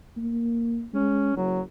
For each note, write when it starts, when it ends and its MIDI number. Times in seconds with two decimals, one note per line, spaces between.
0.17 0.85 58
0.93 1.33 56
0.93 1.33 61
1.37 1.63 30
1.37 1.61 54